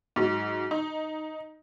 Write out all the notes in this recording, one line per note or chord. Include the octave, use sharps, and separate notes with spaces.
G#2 F#3
D#4